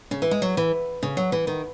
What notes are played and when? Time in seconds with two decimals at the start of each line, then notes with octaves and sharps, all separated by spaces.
0.11 C#3
0.22 E3
0.31 G#3
0.42 F#3
0.57 E3
1.03 C#3
1.17 F#3
1.32 E3
1.47 D#3